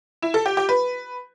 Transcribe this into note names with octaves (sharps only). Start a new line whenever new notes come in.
E4
A4
G4
G4
B4